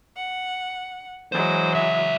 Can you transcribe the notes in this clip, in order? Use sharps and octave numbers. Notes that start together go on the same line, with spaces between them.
F#5
E3 F#3 G#3 C5
C#2 E5